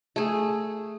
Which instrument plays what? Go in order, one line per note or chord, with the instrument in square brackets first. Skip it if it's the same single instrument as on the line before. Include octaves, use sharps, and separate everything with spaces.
[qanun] A3 G#4